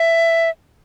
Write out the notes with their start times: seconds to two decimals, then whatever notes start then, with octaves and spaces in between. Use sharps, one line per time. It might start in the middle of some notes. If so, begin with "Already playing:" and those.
Already playing: E5